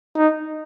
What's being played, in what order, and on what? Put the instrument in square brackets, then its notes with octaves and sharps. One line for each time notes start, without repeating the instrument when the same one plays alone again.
[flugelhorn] D#4